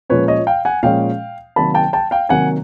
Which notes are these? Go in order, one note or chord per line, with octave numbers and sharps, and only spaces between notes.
A#2 F3 G#3 C#4 B4 C#5
C#5 D#5
F5 G5
F#5 G#5
A#2 F3 G#3 C#4 F5 G5
C3 D#3 F#3 A#3 A5 B5
G5 A5
G5 A5
F5 G5
C3 D#3 F#3 A#3 F#5 G#5